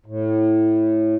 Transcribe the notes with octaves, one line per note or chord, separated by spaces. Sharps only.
A2